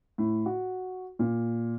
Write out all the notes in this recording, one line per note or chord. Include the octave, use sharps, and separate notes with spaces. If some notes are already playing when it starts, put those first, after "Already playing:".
A2
F#4
A#2